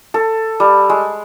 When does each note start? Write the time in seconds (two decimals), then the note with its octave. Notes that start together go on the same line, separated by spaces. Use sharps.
0.14 A4
0.60 G3
0.90 G#3